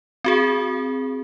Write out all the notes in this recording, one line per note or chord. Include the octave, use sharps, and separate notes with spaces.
C4 F#4 G#4